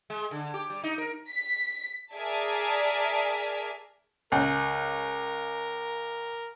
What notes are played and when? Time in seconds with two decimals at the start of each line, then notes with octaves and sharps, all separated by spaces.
0.10 G#3
0.31 D3
0.54 G4
0.70 G3
0.84 D#4
0.98 A#4
1.30 B6
2.14 G#4 A#4 D5 E5 G#5 A5
4.32 C#2 A#4